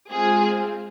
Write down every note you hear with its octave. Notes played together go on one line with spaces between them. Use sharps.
G#3 C4 F4 G#4